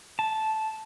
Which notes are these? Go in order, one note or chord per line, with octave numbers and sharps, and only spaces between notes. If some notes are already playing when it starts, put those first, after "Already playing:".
A5